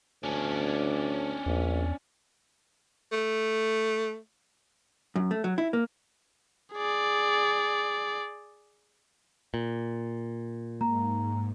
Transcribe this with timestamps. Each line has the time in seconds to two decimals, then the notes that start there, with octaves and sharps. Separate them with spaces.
0.23 D2 C#4 D4
1.46 A#1 E2
3.12 A3
5.16 F#2
5.31 A3
5.44 F#3
5.58 E4
5.73 A#3
6.73 G#4 D5
9.54 A#2
10.81 G#2 A#3 A#5